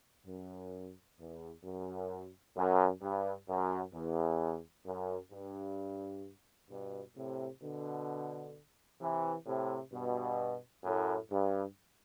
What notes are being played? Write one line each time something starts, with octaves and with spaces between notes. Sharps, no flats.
F#2
E2
F#2
F#2
G2
F#2
E2
F#2
G2
G2 B2
A2 C3
B2 D3
C3 E3
A2 C3
G2 B2
F#2 A2
G2